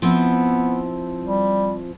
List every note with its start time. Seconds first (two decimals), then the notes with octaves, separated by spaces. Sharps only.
0.02 F3 B3 C4 E4
1.24 G3